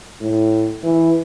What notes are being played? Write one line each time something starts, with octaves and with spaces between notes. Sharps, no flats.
A2
E3